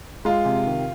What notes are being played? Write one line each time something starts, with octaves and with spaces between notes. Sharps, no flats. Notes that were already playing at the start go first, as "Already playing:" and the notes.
G#3 F4
C3
D#3